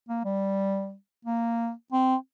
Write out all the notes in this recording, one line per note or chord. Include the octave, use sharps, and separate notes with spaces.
A#3
G3
A#3
C4